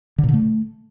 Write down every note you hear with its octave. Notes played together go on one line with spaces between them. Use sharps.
D3
A#2
D3
A3